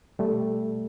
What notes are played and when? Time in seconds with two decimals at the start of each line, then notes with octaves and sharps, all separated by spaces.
0.19 B2 G3 A3